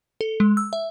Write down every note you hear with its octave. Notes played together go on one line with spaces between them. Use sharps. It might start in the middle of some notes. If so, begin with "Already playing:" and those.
A4
G#3
E6
E5